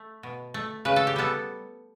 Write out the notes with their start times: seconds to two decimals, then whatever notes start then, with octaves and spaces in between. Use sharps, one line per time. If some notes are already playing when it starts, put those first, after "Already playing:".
Already playing: A3
0.23 B2
0.54 A3
0.85 C#3 B4
0.96 A4
1.07 G4
1.16 G3 B3 A4